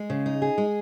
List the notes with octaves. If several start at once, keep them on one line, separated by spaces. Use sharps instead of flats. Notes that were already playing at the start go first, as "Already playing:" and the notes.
Already playing: G#3
C#3
D#4
G#4
G#3